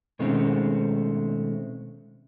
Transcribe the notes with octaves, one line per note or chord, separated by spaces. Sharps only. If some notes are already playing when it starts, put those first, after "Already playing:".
B2 D#3 G#3 A3 C4 C#4